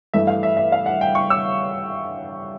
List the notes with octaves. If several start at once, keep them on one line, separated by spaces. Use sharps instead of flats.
G2 E3 A3 E5
F5
E5
E5
F5
F#5
G5
C#6
E6